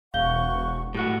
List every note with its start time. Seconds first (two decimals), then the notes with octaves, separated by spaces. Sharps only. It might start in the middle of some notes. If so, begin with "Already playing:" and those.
0.14 E1 F5 F#5 C#6 G6 G7
0.95 A2 F#4 G4 F#6